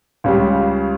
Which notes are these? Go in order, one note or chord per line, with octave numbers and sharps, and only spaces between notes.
C#2 C#3 G3